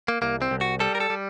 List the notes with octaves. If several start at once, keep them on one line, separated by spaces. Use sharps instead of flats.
A#3
C2 A#3
C4
C2
F#4
G3 A4
A#4
A4
G3